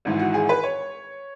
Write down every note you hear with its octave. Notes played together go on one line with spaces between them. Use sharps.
G#1 G#2 E3
F#4
G#4
B4
C#5